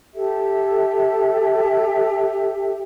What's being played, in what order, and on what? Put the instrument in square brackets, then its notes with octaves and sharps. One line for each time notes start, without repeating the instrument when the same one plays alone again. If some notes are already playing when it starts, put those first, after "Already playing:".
[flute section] G4 A4 E5